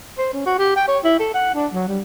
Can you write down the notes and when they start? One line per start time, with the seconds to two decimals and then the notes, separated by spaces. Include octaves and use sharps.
0.18 C5
0.34 C#4
0.46 F#4
0.59 G4
0.76 G5
0.88 C#5
1.04 E4
1.19 A4
1.34 F#5
1.55 D4
1.73 F#3
1.88 G3